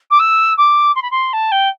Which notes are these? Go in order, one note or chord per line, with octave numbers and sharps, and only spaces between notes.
D6
E6
D6
C6
B5
C6
A5
G5